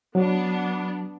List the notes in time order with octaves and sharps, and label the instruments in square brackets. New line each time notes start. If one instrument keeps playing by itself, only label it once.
[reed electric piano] F#3 [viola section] B3 D4